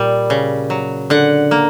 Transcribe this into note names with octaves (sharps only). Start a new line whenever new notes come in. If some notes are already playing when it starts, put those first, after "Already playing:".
Already playing: A#2 G3
C#3
F#3
D3 F#5
A#3